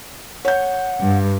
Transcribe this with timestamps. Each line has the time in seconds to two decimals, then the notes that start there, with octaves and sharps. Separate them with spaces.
0.45 C#5 F#5 G6
1.01 G2